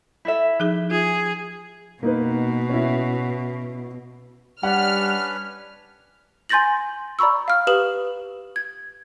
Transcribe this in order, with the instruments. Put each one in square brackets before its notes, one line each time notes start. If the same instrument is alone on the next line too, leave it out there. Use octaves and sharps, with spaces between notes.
[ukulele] E4 A4 E5
[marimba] F3 D#4 G#4
[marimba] F4 [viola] G#4
[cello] B2 [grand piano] A#3 D#4 B4
[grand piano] C#4 E4
[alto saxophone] G3 [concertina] C#4 D4 B4 [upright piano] F#5 [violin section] F6
[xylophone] G#5 C6 G6 A6 A#6 F#7
D5 A#5 B5 C#6 E6
F5 F6
G4 B4 F5 D#6 E7 F#7
G#6